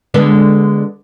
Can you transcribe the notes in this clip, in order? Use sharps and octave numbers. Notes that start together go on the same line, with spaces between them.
D3 G#3 B3